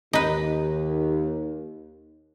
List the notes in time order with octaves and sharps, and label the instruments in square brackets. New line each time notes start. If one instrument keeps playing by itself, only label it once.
[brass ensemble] D#2 [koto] D#4 B4